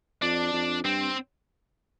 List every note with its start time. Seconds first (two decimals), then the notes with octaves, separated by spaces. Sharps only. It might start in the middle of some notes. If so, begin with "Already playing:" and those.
0.22 F2 D4
0.53 F2
0.84 G2 C4